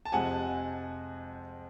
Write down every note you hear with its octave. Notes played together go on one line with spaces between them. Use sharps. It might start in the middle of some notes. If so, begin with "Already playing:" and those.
A5
F2 C3 F3 G#3 F#5 G#5